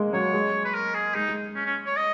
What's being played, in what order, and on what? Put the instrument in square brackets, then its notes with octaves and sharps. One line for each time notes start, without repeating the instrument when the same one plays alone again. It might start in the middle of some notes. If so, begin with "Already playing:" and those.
Already playing: [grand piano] G#3 A#3
[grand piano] F#3 [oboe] C#5
[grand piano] G#3
[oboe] B4
A#4
G#4
[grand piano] G#3 [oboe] D#4
[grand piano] G#3
[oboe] C#4
C#4
C#5
D#5